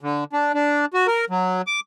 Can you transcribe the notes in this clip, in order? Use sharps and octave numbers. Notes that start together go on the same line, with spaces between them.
D3
D4
D4
F#4
A#4
F#3
D6